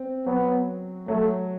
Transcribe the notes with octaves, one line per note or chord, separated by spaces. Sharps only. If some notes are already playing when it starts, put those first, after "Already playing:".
Already playing: C4
F#3 B3
F#3 A3